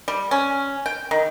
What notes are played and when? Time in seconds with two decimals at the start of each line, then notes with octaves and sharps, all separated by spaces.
0.08 G3
0.31 C#4
0.86 G5
1.11 D#3